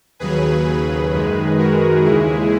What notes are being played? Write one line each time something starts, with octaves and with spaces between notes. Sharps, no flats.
D#2 C#3 F#3 G#4 B4
F#2 D#3 G#3
F#4 A#4
D#2 C#3 E3 G#3 E4 G#4